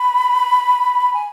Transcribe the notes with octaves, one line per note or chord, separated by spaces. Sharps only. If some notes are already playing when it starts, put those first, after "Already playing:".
Already playing: B5
G#5